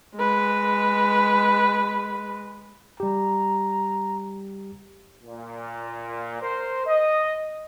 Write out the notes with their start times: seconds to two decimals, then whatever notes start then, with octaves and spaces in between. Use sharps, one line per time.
0.16 G#3 B4
3.00 G3 G4 A#5
5.24 A#2
6.41 A#4 C5
6.86 D#5